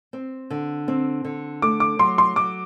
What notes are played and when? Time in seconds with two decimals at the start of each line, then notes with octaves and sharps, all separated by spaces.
0.13 C4
0.50 D3
0.88 C4
1.25 D3
1.62 A3 D6
1.80 D6
1.99 F#3 C6
2.18 C6
2.36 F#3 D6